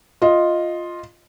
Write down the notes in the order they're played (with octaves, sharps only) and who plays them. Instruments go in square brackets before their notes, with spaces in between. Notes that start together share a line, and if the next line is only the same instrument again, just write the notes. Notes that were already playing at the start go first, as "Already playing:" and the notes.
[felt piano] F4 D#5